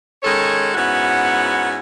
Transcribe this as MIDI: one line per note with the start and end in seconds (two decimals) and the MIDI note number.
0.23 0.70 51
0.23 0.70 56
0.23 0.70 61
0.23 0.70 69
0.23 0.70 73
0.75 1.78 44
0.75 1.78 59
0.75 1.78 61
0.75 1.78 64
0.75 1.78 66
0.75 1.78 78